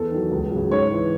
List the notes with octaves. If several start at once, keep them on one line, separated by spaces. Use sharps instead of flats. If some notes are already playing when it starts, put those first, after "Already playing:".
Already playing: E2 A4
D#3 F#3
C#2
C#3 F#3
G#2 C#5
E3